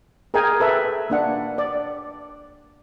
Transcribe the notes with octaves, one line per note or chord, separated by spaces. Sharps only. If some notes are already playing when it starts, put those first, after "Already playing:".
G#4 A#4 D#5 G5 G#5
A4 B4 E5
A#3 D4 F#5
D5